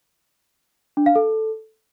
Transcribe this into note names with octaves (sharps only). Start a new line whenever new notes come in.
D4
F5
A4